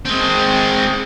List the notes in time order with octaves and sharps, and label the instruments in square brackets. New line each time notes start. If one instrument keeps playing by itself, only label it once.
[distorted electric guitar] G#3 C4